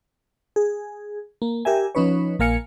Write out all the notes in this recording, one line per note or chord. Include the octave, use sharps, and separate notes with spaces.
G#4
A#3
G4 A#4 E5 G#5
F3 C#4 D#4 B4 C#5
A#1 A#3 A#4 F5 G#5 C#7